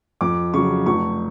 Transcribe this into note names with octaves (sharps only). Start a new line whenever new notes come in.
F2 D6
C#3 F#3 C#6
F1 C#6